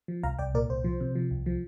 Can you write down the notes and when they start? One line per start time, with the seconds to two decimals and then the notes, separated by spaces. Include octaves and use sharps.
0.08 F3
0.23 C2 F5 A#5
0.38 C2 D5 G5
0.54 A#2 A#4 D5
0.69 C2 C5
0.84 F3
1.01 C3
1.15 F3
1.31 C2
1.46 F3